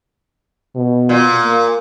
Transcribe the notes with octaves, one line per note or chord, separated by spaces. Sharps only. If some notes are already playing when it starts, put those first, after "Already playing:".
B2
A#2
A#3